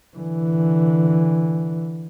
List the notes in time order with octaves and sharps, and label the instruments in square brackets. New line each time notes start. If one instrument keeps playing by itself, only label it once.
[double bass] D3 E3